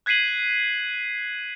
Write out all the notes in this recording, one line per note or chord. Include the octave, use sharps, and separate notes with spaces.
F#6 G#6 B6 C7 D#7 F#7